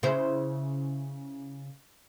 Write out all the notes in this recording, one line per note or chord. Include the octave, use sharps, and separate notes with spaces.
C#3 E4 C5